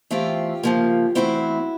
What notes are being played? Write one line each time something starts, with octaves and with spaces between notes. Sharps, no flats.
E3 A3 C4 F4 G4
C#3 F3 A#3
E3 A3 C4 E4 F#4